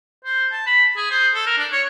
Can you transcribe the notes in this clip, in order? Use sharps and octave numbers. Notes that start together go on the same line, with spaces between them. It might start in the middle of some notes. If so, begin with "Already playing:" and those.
C5
A5
B5
G#4
C5
A4
A#4
D4
C#5